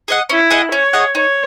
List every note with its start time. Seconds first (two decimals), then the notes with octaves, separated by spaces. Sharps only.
0.08 G#4 D#5 F#5
0.29 C#4 E4
0.50 G#4 D#5 F#5
0.72 C#4 C#5
0.93 G#4 D#5 F#5
1.15 D#4 C#5